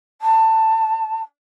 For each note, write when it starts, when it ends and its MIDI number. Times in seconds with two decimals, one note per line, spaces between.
0.21 1.20 81